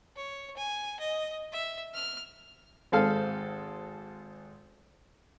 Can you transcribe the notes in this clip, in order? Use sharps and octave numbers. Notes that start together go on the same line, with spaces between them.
C#5
G#5
D#5
E5
F6
G#1 G#3 C4 A4 F5